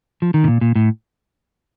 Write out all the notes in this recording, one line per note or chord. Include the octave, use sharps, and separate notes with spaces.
F3
D#3
C3
A#2
A#2
A2